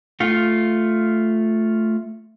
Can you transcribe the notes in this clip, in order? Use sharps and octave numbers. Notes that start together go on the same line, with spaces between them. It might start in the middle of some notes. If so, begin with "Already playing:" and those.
A3 F4